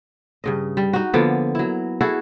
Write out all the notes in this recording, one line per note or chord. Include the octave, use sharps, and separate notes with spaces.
G2 C#3 D#5
G3
D#4 F#4
D3 F3 A#3 B3
F#3 E4
E4 F#4 G#4 A4